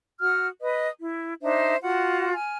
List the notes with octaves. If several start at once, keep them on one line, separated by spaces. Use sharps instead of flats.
F#4 F#5 D#6 F6
B4 D#5 D#6
E4
D4 D#4 C5 E5
F4 F#4 F#5
G#5 F6